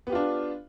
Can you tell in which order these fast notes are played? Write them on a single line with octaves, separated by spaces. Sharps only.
B3 G4 F4 D4